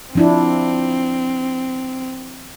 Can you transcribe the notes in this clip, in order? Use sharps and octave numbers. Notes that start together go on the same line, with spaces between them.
F3 C4 D4 E4